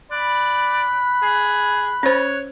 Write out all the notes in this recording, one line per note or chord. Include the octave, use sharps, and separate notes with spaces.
D5 B5 F#6
G#4
C#4 C5 C#5